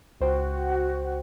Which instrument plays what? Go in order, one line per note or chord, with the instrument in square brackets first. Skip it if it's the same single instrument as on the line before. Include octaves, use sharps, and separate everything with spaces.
[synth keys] C#2 C5 G5 [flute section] F#4